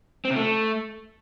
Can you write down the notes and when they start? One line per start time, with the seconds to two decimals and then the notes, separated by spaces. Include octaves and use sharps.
0.25 C4
0.30 C3
0.36 A3